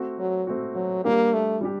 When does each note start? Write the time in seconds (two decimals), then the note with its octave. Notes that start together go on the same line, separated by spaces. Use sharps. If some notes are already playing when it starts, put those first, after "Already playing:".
Already playing: A3 C4 F#4
0.19 F#3
0.47 A3 C4 F#4
0.76 F#3
1.04 G3 A#3 D4 G4
1.33 A3
1.61 G3 D4 G4